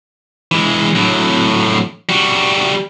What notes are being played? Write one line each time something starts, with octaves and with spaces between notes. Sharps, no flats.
E3 G#3
A2 F#3
G3 F#4